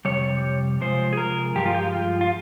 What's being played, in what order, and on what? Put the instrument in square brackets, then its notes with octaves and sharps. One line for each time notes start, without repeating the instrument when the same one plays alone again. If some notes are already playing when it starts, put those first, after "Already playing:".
[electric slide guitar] F2 C3 G3 C#5
C3 F3 G#3 C5
G#4
A#4
G2 F3 G#3 G4
F4
G4
F4
F4